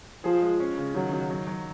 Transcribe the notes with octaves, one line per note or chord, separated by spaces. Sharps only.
F3 G#4
G#3
C#4
C#3
D#3 F#3
D#3
F#3
F#3